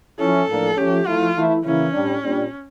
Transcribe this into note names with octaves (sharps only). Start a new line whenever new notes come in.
F3 C#4 E4 A4
A2 F3 A#3 D4
F3 A3 C#4 G4
F3 A3 E4 F4
E3 A3 E4
C#3 E3 A#3 C#4 E4
A2 G3 D4
A#2 G3 D4